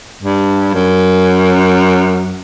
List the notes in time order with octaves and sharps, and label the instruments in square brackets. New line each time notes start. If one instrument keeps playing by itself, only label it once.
[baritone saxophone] G2
F#2